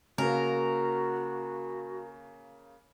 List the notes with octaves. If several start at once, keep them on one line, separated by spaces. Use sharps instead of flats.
C#3 A#3 F#4 A#4